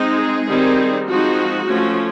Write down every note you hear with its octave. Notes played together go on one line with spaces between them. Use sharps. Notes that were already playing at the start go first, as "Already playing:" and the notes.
Already playing: G#3 C4 D#4
G#4
D#3 G3 C4 D#4
F3 G#3 C4 D#4 F#4
F3 A3 C#4